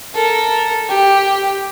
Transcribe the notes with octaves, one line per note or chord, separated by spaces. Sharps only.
A4 A#4
G4